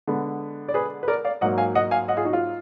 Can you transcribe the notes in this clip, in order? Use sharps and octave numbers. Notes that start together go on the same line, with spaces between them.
D3 G#3 B3
D5
G#4 B4
B4
A#4 D5
D5 F5
G#2 F#3 A#3 D#5 F#5
F5 G#5
D#5 F#5
F5 G#5
D#5 F#5
F4 G#4
D#4 F#4
F4